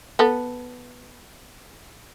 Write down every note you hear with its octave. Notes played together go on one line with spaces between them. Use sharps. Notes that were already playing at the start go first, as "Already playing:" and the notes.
B3 A4